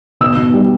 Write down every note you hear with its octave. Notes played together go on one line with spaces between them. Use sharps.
B2 E6
B2
G3